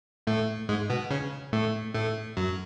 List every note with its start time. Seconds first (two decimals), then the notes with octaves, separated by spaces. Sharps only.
0.27 A2 A3
0.69 G#2 G#3
0.90 B2 B3
1.11 C#3 C#4
1.53 A2 A3
1.94 A2 A3
2.37 F#2 F#3